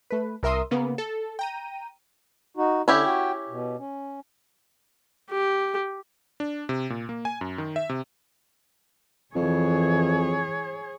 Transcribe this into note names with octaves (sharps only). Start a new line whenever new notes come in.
A3 B4
C2 A#4 E5 C6 D#6
C#3 A#3 B3
A4
G5 A#5 D#7
D#4 F#4
D3 C#4 E4 G4
F#4 G5
B2
C#4
G4
D4
C3
A#2
A#3
G#5
F#2
D#3
E5
C3
F2 E3 G#4 C#5